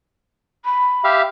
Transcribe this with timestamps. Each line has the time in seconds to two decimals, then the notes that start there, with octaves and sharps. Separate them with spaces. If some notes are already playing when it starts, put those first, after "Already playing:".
0.65 B5
1.04 G4 E5 F5